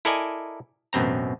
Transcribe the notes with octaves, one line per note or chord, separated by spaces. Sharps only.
E4 A4 A#4 D5 D#5 G#5
A1 F#2 B2 C4 A#5